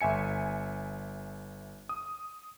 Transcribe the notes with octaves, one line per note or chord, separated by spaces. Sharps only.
G1 E5 G#5 C#7
D#6